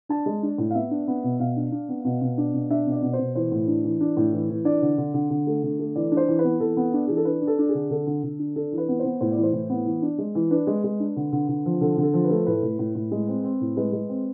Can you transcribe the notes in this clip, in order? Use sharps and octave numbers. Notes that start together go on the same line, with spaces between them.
D4 A5
G#3
D4
A2
F5
B3 E5
D4
B3
B2
B2 F5
D4
D4
B3
B2
B2
D4
B2
D4 E5
B2
D5
B2
C5
B2
E3 C5
A2
D4
E3
D4
A2
E3
E3
D4 D5
D3
D3
D3
D3
A3
D3
A3
E3 D5
D4
C5
E3
B4
B3
E3 A4
B3
D4
E3 G#4
A4
D4 B4
D4
A4
D4
G#4
D3
D3 A4
D3
D3
D4
D4 A4
E3
B4
B3
C5
B3
A2 C5
D5
E3
C5
A2
B3
E3
D4
G#3
E3
D4 B4
G#3
G#3
D4
D3
D3
D3
F3
D3 A4
D3
A4
F3
B4
A3
A2 B4
A2
A2
A2
G#3
C4
C4
A2
G#3 B4
G#3
C4